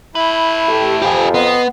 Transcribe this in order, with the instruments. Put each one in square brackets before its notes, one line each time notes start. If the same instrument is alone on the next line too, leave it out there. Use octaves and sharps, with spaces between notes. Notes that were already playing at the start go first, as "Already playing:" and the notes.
[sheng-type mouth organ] E4 [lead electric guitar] A4 B4
[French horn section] A3 G4
[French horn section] F2 [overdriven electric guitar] G4 G#5
[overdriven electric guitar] B3 [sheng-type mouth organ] D#5 C6